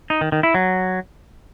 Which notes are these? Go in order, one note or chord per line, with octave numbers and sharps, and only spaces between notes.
D#4
D#3
D#3
E4
F#3